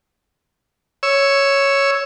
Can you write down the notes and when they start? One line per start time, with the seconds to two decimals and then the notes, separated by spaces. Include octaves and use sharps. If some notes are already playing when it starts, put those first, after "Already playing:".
1.03 C#5 E6